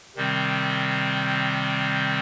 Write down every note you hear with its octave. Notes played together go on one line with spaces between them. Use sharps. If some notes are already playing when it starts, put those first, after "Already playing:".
C3 D#3 G3 C4